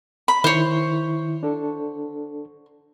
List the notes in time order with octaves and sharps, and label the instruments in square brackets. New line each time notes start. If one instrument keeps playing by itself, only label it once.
[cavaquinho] B5
[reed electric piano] D#3 E4 [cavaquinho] C5 C#5
[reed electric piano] D4 A4